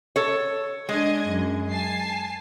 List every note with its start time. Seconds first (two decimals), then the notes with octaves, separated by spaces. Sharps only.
0.16 A4 C#5
0.89 G#3 D4 D#5 G#6
1.28 F#2
1.70 G#5 A5 C7